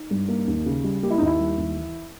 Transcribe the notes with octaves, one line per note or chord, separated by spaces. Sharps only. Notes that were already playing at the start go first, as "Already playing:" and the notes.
Already playing: D#4
G2
A#3
D#2
C#3
G3
A#3 G4
E4
D#4
D#2 E4
G3
D#2
E3